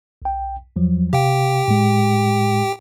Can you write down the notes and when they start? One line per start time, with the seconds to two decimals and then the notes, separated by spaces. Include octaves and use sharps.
0.22 B1 G5
0.76 E2 F3 F#3
1.13 C3 G4 F5 G5
1.68 A2 G#3